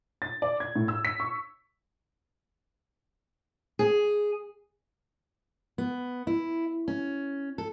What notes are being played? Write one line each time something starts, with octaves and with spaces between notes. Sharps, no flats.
A6
D5
G#6
A2
E6
B6
C#6
G#4
B3
E4
C#4
A4